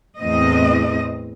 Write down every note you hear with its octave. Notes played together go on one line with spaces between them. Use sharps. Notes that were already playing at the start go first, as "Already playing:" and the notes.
E2 A2 C4 D#5